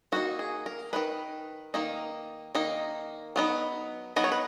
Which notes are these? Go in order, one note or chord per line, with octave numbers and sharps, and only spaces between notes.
D#3 A#3 D#4 F#4
G#4
A#4
D#3 A#3 D#4 B4
D#3 A#3 D#4
D#3 A#3 D#4
F#3 B3 D#4
F#3 B3 D#4 D#5
C#5
B4